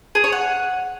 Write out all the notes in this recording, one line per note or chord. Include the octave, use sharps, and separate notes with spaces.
G#4
C#5
F#5